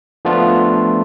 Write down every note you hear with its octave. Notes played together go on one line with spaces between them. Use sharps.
F3 A3 B3 D4 F4